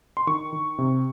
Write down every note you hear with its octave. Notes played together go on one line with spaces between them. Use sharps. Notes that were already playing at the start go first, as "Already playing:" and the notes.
C6
D#3 C#6
D#3
C3